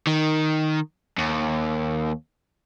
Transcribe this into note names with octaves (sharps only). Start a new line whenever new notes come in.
D#3
D#2